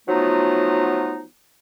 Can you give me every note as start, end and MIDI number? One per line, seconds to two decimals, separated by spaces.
0.08 1.23 53
0.08 1.23 54
0.08 1.23 57
0.08 1.23 59
0.08 1.23 63
0.08 1.23 65